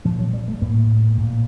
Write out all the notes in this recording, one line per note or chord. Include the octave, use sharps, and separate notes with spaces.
A#2 F3
F#3
G3
A3
A2 A#3
A#2